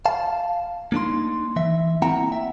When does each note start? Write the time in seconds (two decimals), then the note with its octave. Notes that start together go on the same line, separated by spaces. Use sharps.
0.06 F5 A5
0.92 A#3 D4 D#4 C6
1.56 E3 E5
2.02 A#3 C4 E4 F#5 G5 A#5
2.32 E5